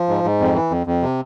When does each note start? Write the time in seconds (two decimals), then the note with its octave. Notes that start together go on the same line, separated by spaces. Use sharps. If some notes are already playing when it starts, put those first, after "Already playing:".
Already playing: F3
0.09 G#2
0.24 G#2
0.40 F2
0.54 E3
0.71 F2
0.87 F2
1.02 C3